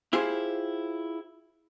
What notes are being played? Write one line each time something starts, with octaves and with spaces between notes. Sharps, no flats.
E4 F4 G4 G#4 C5